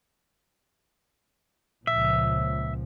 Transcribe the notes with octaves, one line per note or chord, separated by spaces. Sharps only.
C#2 A#2 F3 E5